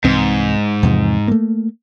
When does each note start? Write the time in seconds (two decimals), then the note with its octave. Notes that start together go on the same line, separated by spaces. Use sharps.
0.04 C2 G#2 E3 C4
0.83 E2 C3 F3
1.28 A3 A#3